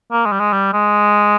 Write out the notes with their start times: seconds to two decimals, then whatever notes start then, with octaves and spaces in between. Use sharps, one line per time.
0.12 A#3
0.26 G#3
0.32 G3
0.40 G#3
0.53 G3
0.73 G#3